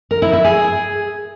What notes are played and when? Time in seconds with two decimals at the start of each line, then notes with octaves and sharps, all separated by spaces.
0.11 A#4
0.22 E4
0.33 E5
0.44 G#4